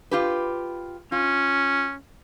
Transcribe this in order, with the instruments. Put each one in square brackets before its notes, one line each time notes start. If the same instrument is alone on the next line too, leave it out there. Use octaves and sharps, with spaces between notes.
[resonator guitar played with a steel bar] F4 G4 B4
[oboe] C#4 [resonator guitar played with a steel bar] F4